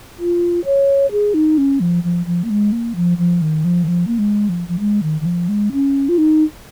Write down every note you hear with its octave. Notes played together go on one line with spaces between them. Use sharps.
F4
C#5
G#4
D#4
C#4
F3
F3
F3
A#3
G#3
A#3
F3
F3
D#3
F3
D#3
F3
A#3
G#3
F3
F3
G#3
D#3
D#3
F3
G#3
C#4
F4
D#4